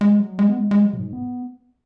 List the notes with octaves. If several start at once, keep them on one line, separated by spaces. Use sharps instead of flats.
G#3
F#3
G#3
B3
G#3
G#3
F#3
B2
G#2
B3